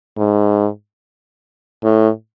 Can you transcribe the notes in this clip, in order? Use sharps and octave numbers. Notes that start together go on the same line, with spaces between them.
G#2
A2